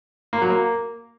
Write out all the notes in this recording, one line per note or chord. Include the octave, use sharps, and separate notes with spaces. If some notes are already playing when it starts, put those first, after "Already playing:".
A#3
F#3
A#3